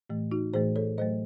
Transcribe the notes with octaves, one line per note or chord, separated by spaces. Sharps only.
A2 E3 A3
D#4 F#4
A2 E3 A3 G#4 C5
A4 C#5
A2 F#3 A3 C5 D#5